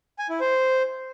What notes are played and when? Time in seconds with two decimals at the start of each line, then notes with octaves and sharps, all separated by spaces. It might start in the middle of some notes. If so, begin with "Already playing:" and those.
0.19 G#5
0.29 E4
0.40 C5